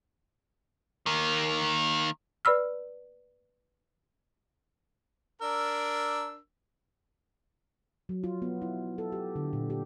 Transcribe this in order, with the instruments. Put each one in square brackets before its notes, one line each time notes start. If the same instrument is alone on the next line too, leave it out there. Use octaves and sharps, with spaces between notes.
[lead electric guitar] D#3 A#3
[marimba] B4 D5 B5 E6 F6
[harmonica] D4 A#4 E6
[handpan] F#3
F4
B3
E4
A4
G4
D3
A#2
G4